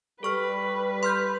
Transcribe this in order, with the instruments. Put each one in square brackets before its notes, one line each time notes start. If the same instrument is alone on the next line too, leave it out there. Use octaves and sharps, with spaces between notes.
[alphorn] G3 [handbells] A4 C#6 F6 [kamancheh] B4
[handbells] C6 F6 G6